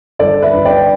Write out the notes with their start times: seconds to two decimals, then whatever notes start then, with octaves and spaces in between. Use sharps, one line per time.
0.19 G1 A4 D5
0.42 B4 E5
0.54 G1
0.65 D5 G5